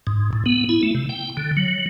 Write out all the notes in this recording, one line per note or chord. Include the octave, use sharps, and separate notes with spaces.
G#2
A2
B3
E4
A3
C3
G5
D3
F#3